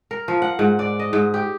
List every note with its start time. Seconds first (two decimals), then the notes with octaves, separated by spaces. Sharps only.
0.11 A#4
0.28 F3
0.42 F#5
0.59 G#2
0.79 D5
1.00 D#5
1.13 G#2
1.34 G4